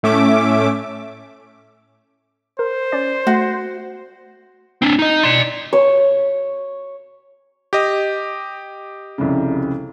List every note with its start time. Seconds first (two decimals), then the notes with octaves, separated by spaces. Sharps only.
0.03 A2 A3 C#4 E5 D6
2.59 A#4 C5
2.92 C#4 D5
3.27 A3 F#4
4.82 C4 D4
4.99 D#4 D#5
5.23 D5 C6
5.73 C#5
7.73 G4 D#5
9.18 C2 F2 C#3